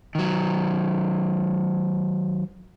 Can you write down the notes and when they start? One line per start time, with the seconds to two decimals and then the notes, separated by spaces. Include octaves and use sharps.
0.15 D#3 F#3